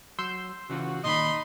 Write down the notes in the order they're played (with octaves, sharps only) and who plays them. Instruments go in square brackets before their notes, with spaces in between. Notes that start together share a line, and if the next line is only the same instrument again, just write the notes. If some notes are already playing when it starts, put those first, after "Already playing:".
[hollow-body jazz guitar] F#3 [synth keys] C6 E6 G6
[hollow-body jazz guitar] C#3 E3 F4 [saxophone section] F#4
[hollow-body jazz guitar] A#2 D#3 [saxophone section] D#4 D#5 [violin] B5 C6